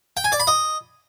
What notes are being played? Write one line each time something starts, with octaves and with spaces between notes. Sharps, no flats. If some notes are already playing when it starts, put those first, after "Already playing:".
G5
G#5
D5
B5
D#5